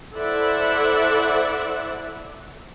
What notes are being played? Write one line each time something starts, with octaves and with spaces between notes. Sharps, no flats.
E4 A4 C5 D5 E5 F#5